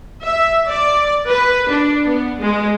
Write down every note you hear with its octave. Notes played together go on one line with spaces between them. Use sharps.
E5
D5
B4
D4
B3
G#3